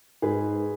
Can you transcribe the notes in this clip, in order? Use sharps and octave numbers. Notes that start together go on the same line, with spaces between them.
G#2 G#4 B4